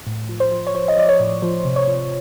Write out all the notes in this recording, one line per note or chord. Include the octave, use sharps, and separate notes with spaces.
A2
F3
C5
F3
C#5
F3 C5
D#5
F3 D5
C#5
A2
F3 C5
C3
C#5
F3